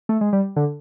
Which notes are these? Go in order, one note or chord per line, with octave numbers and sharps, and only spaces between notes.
A3
G#3
G3
D3